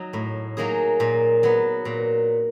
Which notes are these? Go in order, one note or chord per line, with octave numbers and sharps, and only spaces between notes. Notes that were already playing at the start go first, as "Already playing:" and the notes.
Already playing: F#3 D#4
A2
F#3 A#3 D#4 G#4
A#2
F#3 B3
A#2